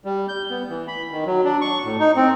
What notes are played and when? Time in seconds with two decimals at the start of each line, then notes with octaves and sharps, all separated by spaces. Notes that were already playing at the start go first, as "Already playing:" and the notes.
0.05 G3
0.28 G6
0.50 B3
0.69 E3
0.88 B5
1.12 D#3
1.26 F#3
1.44 D4
1.61 C#6
1.85 A2
1.99 D#4
2.16 C4